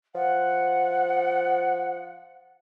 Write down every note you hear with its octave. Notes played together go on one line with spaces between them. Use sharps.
F3 F#5